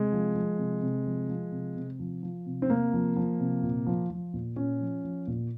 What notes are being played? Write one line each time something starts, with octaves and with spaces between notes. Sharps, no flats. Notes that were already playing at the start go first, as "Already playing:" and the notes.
Already playing: C3 G#3
F3
F3
C3
C3
F3
F3
C3
C3
F3
F3
C3
C4
C3 A#3
F3
F3
C3
A#2
F3
F3
A#2
A#2 C#4
F3
F3
A#2